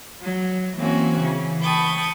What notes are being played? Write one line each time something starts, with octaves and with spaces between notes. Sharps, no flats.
F#3
E3 A#3 C4 C#4 F#4
C#3 E3
G5 A5 B5 C#6 D#6